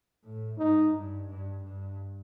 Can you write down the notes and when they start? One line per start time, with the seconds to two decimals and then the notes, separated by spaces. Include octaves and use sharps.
0.25 A2
0.58 G#2 D#4
0.94 G2
1.28 G2
1.63 G2